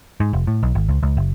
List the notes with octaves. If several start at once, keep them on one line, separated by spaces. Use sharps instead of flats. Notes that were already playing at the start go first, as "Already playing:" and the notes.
G#2
F1
A2
B1
G#1
C#2
C#2
F#1